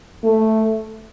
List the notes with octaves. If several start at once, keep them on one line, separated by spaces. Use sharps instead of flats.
A3